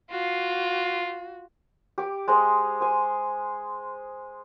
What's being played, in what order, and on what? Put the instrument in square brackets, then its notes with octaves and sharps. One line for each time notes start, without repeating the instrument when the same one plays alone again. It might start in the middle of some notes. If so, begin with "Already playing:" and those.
[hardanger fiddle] F4 [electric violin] F#4
[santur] G4 D6
G#3 G4 C5 D#5
C5 G#5